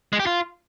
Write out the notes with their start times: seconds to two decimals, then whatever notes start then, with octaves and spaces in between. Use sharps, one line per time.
0.13 G#3
0.20 G4
0.26 F4